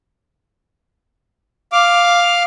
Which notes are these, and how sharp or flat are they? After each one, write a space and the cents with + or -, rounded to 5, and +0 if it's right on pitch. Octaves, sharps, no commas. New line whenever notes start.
F5 +0 D6 +0